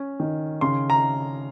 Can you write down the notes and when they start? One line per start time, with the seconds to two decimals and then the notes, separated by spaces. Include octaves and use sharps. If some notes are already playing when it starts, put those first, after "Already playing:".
Already playing: C#4
0.20 D#3
0.61 C#3 C6
0.90 A#5